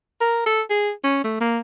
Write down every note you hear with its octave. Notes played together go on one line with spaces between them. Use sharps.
A#4
A4
G#4
C#4
A3
A#3